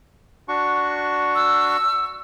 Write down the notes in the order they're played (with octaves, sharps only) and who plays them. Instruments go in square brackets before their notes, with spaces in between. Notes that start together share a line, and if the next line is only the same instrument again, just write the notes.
[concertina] D4 F#4 C#6
[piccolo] E6